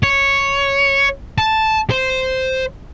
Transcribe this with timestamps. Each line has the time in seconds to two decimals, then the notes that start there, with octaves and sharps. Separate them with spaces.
0.03 C#5
1.38 A5
1.90 C5